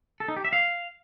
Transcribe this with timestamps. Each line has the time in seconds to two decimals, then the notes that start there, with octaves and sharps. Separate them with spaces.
0.20 A4
0.28 D#4
0.36 G4
0.45 E5
0.53 F5